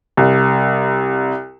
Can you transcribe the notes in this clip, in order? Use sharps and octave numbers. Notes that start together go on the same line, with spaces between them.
C2